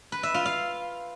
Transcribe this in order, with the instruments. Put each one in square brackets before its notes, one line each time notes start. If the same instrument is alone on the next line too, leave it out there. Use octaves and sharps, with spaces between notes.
[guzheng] B4
E5
F4
F5